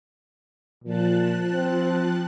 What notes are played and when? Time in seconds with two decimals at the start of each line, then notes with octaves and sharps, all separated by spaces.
0.84 A#2 F3 A5 F#6
1.53 C4